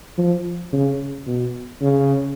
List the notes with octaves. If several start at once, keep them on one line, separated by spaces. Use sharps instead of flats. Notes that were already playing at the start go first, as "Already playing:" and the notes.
F3
C#3
B2
C#3